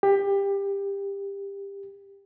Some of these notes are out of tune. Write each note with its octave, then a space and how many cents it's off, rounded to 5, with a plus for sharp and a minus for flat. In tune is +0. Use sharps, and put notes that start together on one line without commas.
G4 +20